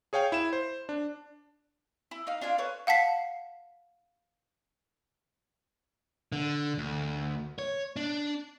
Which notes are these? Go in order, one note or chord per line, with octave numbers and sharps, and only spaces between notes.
G#4 C#5 F5 G5
E4 E7
C5
D4
E4
D#4 F5
D4 F4 F5 G#5
A4 B4 C#5
F5 F#5 A5 B6 C7
D3
D2
C#5
D4